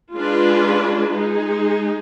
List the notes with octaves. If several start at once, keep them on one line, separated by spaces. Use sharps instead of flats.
G#3 D4 F4 G#4 B4
G#3 D#4 G#4